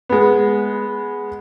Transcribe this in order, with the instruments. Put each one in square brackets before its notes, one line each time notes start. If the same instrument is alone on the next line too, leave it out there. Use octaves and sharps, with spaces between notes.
[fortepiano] G#3 B3